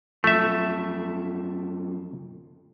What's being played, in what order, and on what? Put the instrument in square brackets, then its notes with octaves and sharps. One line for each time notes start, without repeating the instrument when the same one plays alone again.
[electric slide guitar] F#2 F3 [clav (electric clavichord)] A3 E5